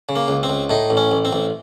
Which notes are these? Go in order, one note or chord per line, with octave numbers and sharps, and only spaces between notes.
C#3
A#3
C#2
C4
C#2
A2 D#4
A1
C#4
A1
C4
A1